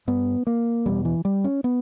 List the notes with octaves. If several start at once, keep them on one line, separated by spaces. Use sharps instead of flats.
G2 B3
A#3
E2 B2 G3
E3
G3
C#4
B3